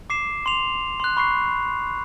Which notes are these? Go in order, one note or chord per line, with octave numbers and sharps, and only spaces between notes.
D6 C7 E7
C6 F7
C6 F#6
B5 C#6 F#6 C7